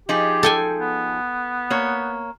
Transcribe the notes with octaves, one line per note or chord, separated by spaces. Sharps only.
F3 D#4 G4 G#4
A4 G5 G#5
B3
A#3 C#5